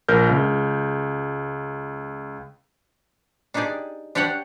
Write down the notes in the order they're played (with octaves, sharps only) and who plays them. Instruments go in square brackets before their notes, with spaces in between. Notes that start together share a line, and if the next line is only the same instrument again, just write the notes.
[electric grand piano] A#1 A#4 F6 G6
C#2
[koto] D4 D#4 G4 G#4 D5
D4 G4 C#5 D5 F#5 G5